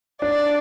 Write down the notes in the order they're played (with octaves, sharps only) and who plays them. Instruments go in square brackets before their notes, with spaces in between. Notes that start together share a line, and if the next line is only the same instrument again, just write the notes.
[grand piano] D4 [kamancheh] D5